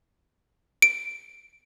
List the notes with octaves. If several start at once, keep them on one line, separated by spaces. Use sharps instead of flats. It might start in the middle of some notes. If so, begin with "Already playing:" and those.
D7